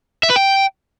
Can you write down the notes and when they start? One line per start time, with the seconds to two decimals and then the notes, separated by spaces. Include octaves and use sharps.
0.23 E5
0.30 B4
0.36 G5